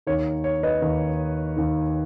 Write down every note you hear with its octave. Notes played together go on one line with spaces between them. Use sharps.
D#2 D#3 C#5
C#5
B4 D#5
D#2 D#3
D#2 D#3